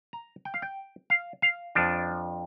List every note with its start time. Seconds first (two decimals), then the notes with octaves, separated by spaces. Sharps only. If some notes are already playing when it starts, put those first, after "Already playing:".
0.13 A#5
0.45 G5
0.54 F5
0.62 G5
1.10 F5
1.42 F5
1.75 F2 F3 D4